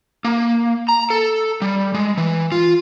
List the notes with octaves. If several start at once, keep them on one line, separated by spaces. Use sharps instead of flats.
A#3
A#5
A4
G3
G#3
E3
F4